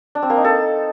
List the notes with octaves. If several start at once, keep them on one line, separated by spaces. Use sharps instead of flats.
D4
C4
A#3
D#4
A4